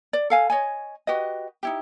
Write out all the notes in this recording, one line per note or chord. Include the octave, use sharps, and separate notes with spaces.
D5
A4 F5 G#5
C#5 D#5 G#5
F#4 G4 B4 D#5
D#4 E4 G4